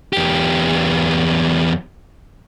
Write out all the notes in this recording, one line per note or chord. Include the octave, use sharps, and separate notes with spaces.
E2 G4